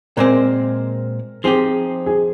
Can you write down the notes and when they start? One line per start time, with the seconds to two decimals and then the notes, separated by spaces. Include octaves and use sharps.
0.17 A#2 G#3 C4 A#4
1.44 F3 C4 D#4 G4 G#4
2.06 G#4